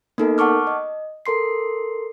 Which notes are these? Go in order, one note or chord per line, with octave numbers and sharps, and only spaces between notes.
A#3 B3 D#4 A4 A#4
F#5 A5 C#6 D6 F6
D#5
A4 A#4 C6 C7